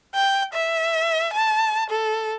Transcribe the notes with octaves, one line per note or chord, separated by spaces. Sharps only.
G5
E5
A5
A4